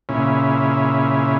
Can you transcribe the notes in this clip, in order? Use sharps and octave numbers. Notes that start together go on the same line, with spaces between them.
A#2 C#3 C#4 E4